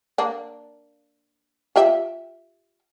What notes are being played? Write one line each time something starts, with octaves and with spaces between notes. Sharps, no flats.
A#3 D4
F4 G4 E5